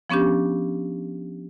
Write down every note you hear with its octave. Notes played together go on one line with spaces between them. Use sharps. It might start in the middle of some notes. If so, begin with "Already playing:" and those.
F3 B3 C#4 D4 G4